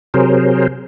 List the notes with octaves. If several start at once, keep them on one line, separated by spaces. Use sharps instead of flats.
C3 F#3 G#4 A#4 C5